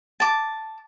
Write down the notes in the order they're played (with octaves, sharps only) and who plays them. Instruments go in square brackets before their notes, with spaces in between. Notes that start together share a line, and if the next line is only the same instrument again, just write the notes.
[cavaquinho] A5 D6